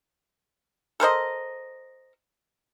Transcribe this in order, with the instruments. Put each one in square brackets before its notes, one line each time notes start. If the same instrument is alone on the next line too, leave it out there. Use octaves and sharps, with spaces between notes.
[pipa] A4 A#4 C5 D#5